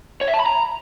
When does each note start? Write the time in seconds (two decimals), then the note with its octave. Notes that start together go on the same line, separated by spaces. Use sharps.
0.21 C#5
0.27 E5
0.34 A5
0.40 B5
0.46 A#5